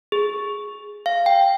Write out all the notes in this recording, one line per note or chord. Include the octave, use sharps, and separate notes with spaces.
G#4
F5
G5